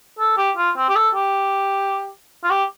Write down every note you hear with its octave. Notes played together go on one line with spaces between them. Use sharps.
A4
G4
F4
C4
G4
A4
G4
F4
G4